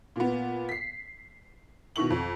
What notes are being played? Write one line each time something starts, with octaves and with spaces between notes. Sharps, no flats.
A#2 B3
B6 C7
B2 D#3 E4 C#6 F#7
F2